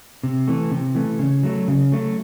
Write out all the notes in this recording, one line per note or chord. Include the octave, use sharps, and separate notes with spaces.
C3
E3 A3
C3
E3 A3
C#3
F#3 A3
C#3
F#3 A3